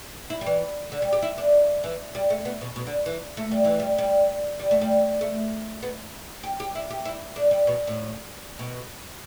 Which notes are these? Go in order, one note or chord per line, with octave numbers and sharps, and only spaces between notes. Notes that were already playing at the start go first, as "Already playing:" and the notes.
E4
G3
E3
D3
G3
G4
E4
D4
E3
G3
A3
B3
B2
B2
D3
E3
A3
G3
E3
G3
G3
G3
A3
G3
A3
B3
G4
G4
E4
G4
E4
D4
G3
B2
A2
B2